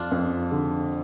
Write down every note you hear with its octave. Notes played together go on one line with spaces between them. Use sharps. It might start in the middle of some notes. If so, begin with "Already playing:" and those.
Already playing: F2 D4 F4
F2
D3